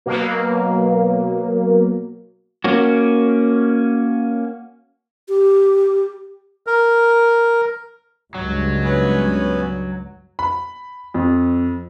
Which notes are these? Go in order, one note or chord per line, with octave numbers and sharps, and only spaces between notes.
B2 F#3 A#3
A#3 C#4 F#4
G4
A#4
C#2 G2 F#3 G#3
B3 C#4 B4
B5
F2